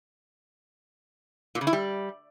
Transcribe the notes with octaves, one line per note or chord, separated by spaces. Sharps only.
A#2
C#3
E4
G3